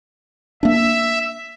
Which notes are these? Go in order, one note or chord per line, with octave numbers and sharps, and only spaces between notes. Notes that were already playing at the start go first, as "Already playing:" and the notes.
A#3 D4 E5